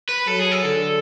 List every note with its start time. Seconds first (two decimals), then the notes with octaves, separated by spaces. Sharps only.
0.09 B4
0.27 F#3 A4
0.39 G#4
0.52 A4
0.64 D3